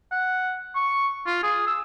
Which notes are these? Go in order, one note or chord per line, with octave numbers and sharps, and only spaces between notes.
F#5
C#6
F4
G#4
E6